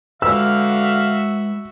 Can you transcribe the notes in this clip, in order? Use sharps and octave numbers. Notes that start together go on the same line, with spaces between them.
D3 G#3 F#4 B4 E5 F5 E6 F6